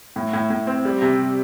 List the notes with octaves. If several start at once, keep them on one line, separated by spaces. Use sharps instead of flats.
A2
A2
A2
C4
G3
C3